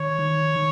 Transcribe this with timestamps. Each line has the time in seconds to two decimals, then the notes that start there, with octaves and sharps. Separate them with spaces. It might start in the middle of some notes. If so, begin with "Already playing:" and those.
Already playing: D#3 C#5
0.19 D#3
0.56 D#3